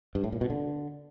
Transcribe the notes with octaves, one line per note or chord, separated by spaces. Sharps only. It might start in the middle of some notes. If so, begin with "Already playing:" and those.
G2
A2
A#2
B2
D3